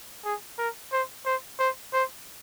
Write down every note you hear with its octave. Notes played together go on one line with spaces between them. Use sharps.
G#4
A#4
C5
C5
C5
C5